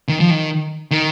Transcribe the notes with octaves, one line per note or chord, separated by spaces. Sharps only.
D#3
F3
D#3
D#3